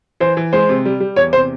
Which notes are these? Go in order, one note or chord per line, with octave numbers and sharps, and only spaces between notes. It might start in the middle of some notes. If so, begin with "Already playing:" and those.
E3 C5
E3
G#3 C5
C3
G3
G3
E2 C#5
C3 C5